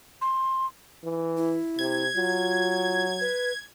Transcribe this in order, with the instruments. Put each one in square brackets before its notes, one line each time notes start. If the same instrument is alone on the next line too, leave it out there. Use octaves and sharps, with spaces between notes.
[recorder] C6
[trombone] E3
[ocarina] E4
[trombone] C3 [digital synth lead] G#6
[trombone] F#3 [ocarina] F4
[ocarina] B4